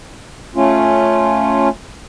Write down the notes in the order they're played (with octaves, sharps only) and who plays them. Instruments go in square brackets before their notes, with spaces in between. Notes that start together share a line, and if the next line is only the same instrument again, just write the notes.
[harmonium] A3 C#4 F4